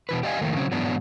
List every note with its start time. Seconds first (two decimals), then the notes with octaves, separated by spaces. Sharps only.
0.09 B2 E3 B4
0.23 G4 D5 D#5 F5 G#5
0.41 F2 A2 D#3 A3 A#3
0.56 C#3 F#3 C4
0.71 G#2 E3 F#3 B3 D4